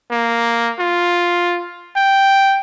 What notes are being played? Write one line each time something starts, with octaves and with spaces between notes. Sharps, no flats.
A#3
F4
G5